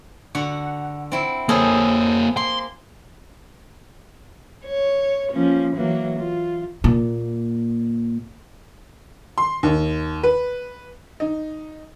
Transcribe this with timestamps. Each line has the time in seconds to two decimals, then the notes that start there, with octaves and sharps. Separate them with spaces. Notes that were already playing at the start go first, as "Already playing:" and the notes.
0.35 D3 F#4 F#5
1.12 C4 E4
1.49 A#3 G#4 A4 C5 C#5
2.37 A#3 C6
4.65 C#5
5.32 F3 A#3 C#4
5.75 E3 F#3 A#3
6.18 F4
6.84 A#2
9.38 C6
9.63 D#2
10.23 B4
11.20 D#4